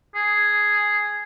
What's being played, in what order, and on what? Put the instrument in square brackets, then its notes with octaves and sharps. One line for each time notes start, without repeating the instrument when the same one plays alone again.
[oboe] G#4